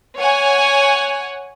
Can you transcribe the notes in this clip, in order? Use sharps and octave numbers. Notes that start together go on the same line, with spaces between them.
C#5 F#5 G#5